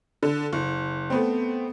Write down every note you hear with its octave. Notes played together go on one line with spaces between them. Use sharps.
D3
F#1
A3 B3 C4